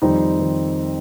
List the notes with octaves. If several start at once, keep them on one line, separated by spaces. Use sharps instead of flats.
F2 D#3 G3 C4 D#4
D#3 G3